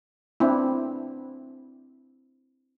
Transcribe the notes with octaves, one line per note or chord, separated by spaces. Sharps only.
C4 D4 E4